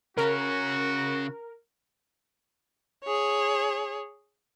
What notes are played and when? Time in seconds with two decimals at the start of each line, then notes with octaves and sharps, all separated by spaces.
0.17 C#3 C#4 F#4 A#4
3.04 G#4 C#5